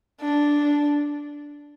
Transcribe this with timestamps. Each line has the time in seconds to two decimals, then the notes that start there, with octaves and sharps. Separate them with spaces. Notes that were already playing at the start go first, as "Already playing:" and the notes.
0.22 D4